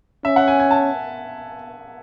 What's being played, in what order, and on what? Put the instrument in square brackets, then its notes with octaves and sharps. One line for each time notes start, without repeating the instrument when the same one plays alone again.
[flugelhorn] C#4 [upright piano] E5
[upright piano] F#5
G#5
G#5
A5